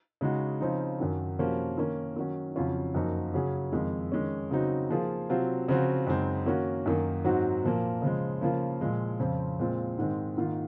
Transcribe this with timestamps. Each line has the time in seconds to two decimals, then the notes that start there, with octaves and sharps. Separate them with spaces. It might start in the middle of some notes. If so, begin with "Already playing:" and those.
0.21 C#3 G#3 D#4 F#4
0.60 C#3 F3 C4 D#4
0.99 F#2 D#3 F#3
1.39 C3 F3 A#3 C#4 F#4
1.78 D#3 A#3 C#4
2.16 D#3 F#3 C#4
2.56 F2 C#3 F#3 C#4 F4
2.95 F#2 F3 A#3 D#4 F#4
3.34 C#3 F#3 C#4 G#4
3.72 F2 D#3 G#3
4.12 D#3 G#3 C#4
4.51 C#3 F#3 C4 D#4 F#4
4.90 F3 A#3 F4 G#4
5.29 C3 F#3 C4 F4
5.68 C#3 F3 C4 F#4
6.07 F#2 C#3 G#3 C4 D#4
6.46 D#3 A#3 C#4 F#4
6.86 F#2 D#3 A#3
7.25 G#2 F#3 C4 D#4 F#4
7.64 A#2 F3 A#3
8.02 C#3 F3 G#3
8.41 C#3 F3 A#3 F4
8.81 A#2 F3 G#3
9.20 F2 C#3 F3 C4
9.59 A#2 G#3 C4 F4
9.98 G#2 D#3 G#3 C4
10.37 G#2 D#3 A#3 F4